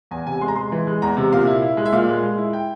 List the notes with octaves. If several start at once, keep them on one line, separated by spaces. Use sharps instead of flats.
E2 G#5
C3 G#5
G#3 C6
A#5
G#3 C6
E3
G#3
E2 A#5
C3
A#2 F5
E4
E4
G#3
E5
A#2 F5
G#3
G#3
E4
G5